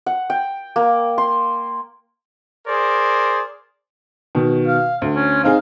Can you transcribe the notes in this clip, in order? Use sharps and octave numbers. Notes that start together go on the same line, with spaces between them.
F#5
G5
A#3
C6
G#4 A#4 C5 D5
B2 D#3
F5
D2
C#4
C4 D#4 G#4 F5